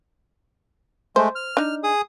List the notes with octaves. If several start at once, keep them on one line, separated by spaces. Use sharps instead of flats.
G#3 A3 C5
F6
D4 D#4
G#4 D#6